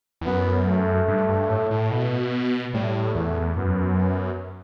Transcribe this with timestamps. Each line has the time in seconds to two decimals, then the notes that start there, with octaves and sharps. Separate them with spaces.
0.21 E2
0.25 F#2 B3
0.67 A3
1.08 G2
1.29 G2
1.50 A2
1.71 A2
1.91 B2
2.73 A2 G3
3.15 E2 A3
3.56 F#2 B3
3.98 B3